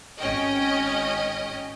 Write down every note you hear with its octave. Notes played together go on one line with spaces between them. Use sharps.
G#1 C#4 D#5 G5